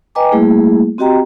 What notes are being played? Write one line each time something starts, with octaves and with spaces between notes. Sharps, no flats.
B4 D#5 G5 G#5 A#5 D6
G3 A3 A#3 E4 G#4
C4 F#4 G4 D#5 G5 A#5